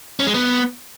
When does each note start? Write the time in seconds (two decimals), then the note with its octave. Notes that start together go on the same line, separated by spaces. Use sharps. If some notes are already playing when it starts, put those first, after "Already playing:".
0.20 C#4
0.27 G#3
0.34 B3